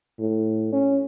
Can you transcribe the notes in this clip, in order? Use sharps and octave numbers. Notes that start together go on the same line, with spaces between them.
A2
C#4